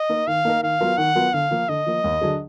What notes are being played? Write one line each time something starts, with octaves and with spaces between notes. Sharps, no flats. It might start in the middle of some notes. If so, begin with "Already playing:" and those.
Already playing: D#5
A#3 D#4 A#4
D#3 F5
A#3 D#4 A#4
D#3 F5
F#3 B3 F4 A#4
D#3 F#5
F#3 B3 F4 A#4
D3 F5
F3 A#3
D3 D#5
F3 A#3
D#2
D3 F#3 D4 G#4